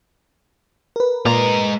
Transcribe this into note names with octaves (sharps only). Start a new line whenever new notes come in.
A#4 B4
A#2 G#3 A#3 F4 A#5